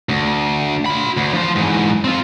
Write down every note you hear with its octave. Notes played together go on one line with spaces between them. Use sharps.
D2
F4 B5
D2
F3 C5
G#2 E3
C4 F4